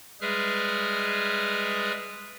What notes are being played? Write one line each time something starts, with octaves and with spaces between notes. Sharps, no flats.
G3 G#3 G#4 B4 E5 F6